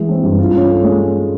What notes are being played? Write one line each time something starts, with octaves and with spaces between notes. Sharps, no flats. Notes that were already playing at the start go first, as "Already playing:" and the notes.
Already playing: E3 G#3
C4
G2
F4
C#4
A4
G#3